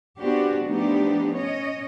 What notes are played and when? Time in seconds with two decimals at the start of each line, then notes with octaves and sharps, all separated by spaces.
0.19 B3 C4 D4 F#4 G4
0.65 F3 A3 B3 D4 D#4 G4
1.34 C#4 C#5 D#5